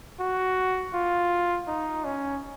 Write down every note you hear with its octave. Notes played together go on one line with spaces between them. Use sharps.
F#4
F4
D#4
C#4